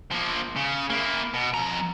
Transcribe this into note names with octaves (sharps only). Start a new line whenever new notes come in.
F3 A#3
C#3
A#3 E4
B2
F2 A#5